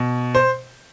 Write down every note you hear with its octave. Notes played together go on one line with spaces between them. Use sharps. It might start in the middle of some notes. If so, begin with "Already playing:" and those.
Already playing: B2
C5